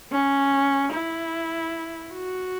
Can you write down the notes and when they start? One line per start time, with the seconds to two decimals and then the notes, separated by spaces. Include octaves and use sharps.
0.12 C#4
0.92 E4
2.13 F#4